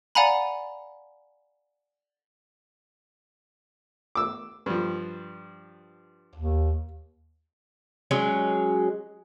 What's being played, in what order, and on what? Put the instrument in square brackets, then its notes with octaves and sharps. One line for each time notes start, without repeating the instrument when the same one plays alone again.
[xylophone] D5 F5 F#5 G#5 A#5 B5
[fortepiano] D6 E6
G2 F3
[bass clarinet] D#2
[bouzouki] F#3 G#3 C#4